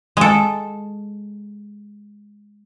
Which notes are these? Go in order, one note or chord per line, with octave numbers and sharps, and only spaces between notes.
G#3 A4